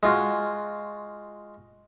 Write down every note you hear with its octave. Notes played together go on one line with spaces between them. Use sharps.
G#3 F4 F#4